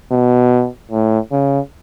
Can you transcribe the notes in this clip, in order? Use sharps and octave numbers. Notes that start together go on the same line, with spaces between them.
B2
A2
C#3